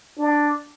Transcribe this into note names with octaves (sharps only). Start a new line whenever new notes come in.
D4